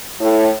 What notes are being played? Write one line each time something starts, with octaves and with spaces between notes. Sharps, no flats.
A2